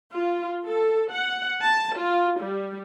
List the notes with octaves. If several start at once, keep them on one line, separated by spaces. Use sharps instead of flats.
F4
A4
F#5
A5
F4
G3